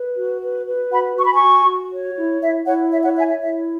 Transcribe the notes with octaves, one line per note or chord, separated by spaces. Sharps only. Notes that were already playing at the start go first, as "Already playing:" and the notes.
Already playing: B4
F#4
B4
B4
F#4 F#5 B5
F#4 C#6
B5
G#5 C#6
F#4
F#4
C#5
E4
E4 E5
E4 C#5 F#5
C#5 E5
C#5 F#5
C#5 E5 G#5
E5
E4 E5